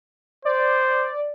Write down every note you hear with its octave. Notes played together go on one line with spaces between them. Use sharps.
C5 D5